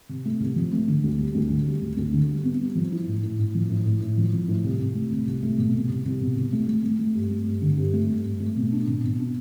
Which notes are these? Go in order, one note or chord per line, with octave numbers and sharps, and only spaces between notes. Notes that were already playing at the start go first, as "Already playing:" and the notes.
C3
A3
C2
F3
A3
D3
D2
G3
D2
D3
G3
D2
D2
D3
G3
B3
G3
F3
E4
A2
A2
A2
F3
A2
A2
A2
F3
F3
A2
C2
C2
A3
C2
C2
A3
B2
C2
C2
C2
B2
C2
A3
A3
A3
A3
G2
A3
G2
D3
G2
A3
G2
G2
A3
B2
D4
B2
B2
D4